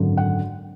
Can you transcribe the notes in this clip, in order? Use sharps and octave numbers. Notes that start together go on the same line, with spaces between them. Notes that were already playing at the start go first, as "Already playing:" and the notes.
Already playing: G#1 F#2 D3 F#3
F#5